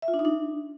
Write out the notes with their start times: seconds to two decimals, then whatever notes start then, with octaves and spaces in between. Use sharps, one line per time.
0.02 E5
0.08 F4
0.14 D4
0.19 D#4
0.25 D4